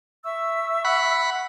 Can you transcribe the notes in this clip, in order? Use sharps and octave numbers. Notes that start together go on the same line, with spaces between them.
E5 C#6 E6
F#5 B5